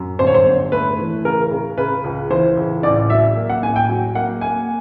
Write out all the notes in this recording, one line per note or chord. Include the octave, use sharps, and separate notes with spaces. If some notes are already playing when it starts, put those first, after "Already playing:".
Already playing: F#2
G1 C5
C#5
C5
G1
A3 B4
E3
C#3 A#4
C#3
C#3 B4
C#2
E3 C5
C#2
A1 D5
F#3 E5
A#3
F#5
A1 G#5
G5
F#3
A#3 F#5
A#3 G#5